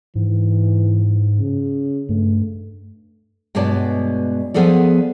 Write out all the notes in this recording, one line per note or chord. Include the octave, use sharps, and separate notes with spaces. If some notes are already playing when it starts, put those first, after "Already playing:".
G#2 E3
C#3
G2 A3
G2 B2 G#3 C#5 D5 A5
F3 B3 G#4 A4 D5